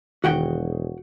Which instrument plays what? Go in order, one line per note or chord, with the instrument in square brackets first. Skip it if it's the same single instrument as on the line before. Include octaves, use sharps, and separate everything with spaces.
[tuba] E1 [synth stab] D#3 G#4 [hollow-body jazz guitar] F#4 F#5 G5